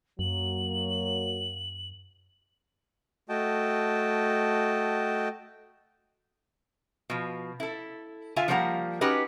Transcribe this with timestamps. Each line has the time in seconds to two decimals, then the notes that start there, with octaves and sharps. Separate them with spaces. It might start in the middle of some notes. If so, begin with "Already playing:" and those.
0.19 F#2 F#3 A#3 F#7
3.29 A3 F#4 D#5 G5 A5
7.10 B2 F3
7.60 E4 A4
8.36 D3 F4 E5 F5 G#5
8.48 F3 G3 A#3 C5 F#5 A#5
9.01 C#4 D#4 F#4 G4 B4 D#5